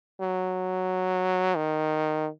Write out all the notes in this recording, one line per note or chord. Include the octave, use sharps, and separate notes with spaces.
F#3
D#3